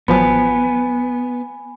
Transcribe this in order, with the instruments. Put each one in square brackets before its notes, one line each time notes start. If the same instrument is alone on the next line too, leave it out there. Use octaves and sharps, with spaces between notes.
[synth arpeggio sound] A1 F3 F#3 [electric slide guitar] B3 [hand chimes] G#5 B5